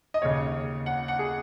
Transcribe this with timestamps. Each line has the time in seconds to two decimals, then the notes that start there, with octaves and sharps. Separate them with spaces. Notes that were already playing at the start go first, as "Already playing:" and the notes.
0.14 D#5
0.22 D#2 C#3 C#5
0.86 F#5
1.08 F#5
1.19 G#4